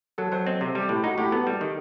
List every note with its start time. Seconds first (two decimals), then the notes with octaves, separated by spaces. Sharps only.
0.18 F#3 A4
0.32 F#3 C5
0.46 C4 D#5
0.61 C3
0.75 G3 G4
0.89 A2
1.04 D#4 F#4
1.18 A2 G4
1.32 B3 A4
1.47 G3
1.61 D#3